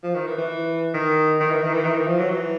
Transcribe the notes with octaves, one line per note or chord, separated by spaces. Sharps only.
F3
D#3
E3
E3
D#3
D#3
E3
D#3
E3
D#3
E3
F3
F#3
E3